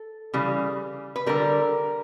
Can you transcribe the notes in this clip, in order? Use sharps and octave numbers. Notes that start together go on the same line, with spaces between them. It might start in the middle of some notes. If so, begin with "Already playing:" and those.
Already playing: A4
C#3 E3 G3
B4
D3 G3 A#4